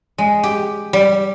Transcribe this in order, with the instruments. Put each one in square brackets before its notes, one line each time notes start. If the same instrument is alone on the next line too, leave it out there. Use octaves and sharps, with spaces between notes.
[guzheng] G#3
G4
G3